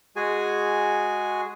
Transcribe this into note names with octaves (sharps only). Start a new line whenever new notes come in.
G#3 F#4 G#4 G#5